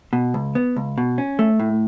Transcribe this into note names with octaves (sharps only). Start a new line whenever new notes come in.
B2
C#2
B3
C#2
B2
C#4
A3
A2